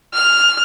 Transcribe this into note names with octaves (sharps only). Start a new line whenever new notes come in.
F6